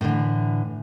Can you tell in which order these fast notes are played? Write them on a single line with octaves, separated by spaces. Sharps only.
A2 D3 E3